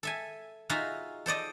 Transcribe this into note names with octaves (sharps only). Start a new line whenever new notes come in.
A4 E5 G#5
D#4 F4 F#4 G#4 E5 F5
A4 C5 D5 D#5